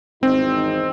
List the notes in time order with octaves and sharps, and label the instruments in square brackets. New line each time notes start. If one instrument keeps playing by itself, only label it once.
[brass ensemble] G#1 E2 D#4 [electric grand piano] C4